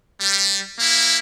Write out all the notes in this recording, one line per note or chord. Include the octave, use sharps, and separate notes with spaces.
G3
A#3 E4